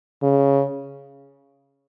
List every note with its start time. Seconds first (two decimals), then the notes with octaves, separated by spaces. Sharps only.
0.23 C#3